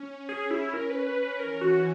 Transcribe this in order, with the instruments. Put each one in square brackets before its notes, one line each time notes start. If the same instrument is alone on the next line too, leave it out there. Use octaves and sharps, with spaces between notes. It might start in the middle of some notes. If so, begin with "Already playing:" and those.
Already playing: [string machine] C#4
[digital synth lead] G#4
E4
A#4
B4
B4
B4
[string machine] E3 [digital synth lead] A#4
[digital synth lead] F#4